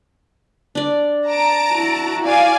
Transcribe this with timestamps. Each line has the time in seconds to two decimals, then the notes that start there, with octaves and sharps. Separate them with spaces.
0.75 D4 D5
1.27 A5 A#5 D7
1.73 E4 F#4
2.24 D5 F5 G#5